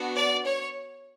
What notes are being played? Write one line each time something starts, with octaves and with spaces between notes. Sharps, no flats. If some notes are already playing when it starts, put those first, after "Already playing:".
Already playing: B3 D4 F#4
D5
C#5